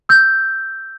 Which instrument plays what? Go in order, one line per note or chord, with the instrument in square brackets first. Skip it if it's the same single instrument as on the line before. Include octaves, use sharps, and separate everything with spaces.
[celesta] E6 G6